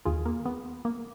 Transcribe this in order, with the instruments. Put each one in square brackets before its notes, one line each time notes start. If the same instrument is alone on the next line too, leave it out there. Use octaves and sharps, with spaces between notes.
[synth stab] D#2 D#3 F4 G#4
A#3
B3
A#3